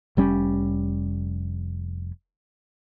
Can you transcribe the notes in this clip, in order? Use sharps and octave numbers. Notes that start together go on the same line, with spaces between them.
F1 G3 C#4